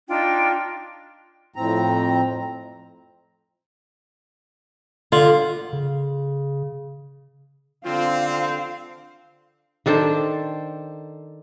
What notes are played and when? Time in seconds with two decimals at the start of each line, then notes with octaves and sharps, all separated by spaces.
0.08 D4 D#4 F4 G5
1.56 F2 A2 C4 A#5
5.12 D3 F4
5.73 C#3
7.85 D3 C4 F4 F5
9.86 D#3 D4 A4 C5